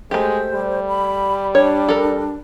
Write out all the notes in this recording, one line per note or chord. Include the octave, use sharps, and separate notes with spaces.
G#3 A3 G4 C5
G3
B5
D4 C#5
A4 A#4